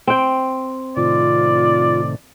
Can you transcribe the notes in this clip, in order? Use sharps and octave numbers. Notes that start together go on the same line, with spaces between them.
C4 G5
A2 C3 D#3 F4 D5